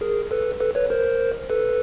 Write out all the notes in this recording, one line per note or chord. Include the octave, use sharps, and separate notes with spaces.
G#4 A#4
A4 B4
A4 B4
B4 C#5
A#4 C5
A4 B4